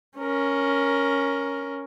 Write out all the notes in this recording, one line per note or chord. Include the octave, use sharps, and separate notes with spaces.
C#4 A#4